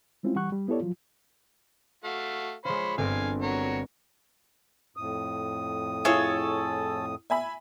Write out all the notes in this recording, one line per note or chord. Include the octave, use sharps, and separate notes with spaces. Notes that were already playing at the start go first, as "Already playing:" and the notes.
G3 G#3 C4 C#4 E4 F4
E3 G3 F#5 C#6 F#6
G3
B3 E4 G4 A4 C#5 D5
F3 F#3 F4
A3 F#4 F5
G#3 F4 C5 C#5 B5
G1 C4 F5 G#5 D7
F#4 A#4 C#5
F2 A2 D#6
E4 F4 G#4 A4 C#5
E5 G#5 B5